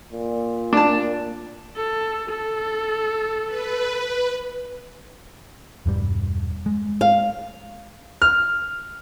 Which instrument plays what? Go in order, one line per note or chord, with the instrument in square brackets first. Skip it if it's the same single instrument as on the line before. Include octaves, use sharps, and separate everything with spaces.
[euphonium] A#2
[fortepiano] D4 A5
[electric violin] A4
A4
[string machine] B4
[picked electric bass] E1 G2 G3
G#3
[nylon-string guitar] F5
[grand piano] F6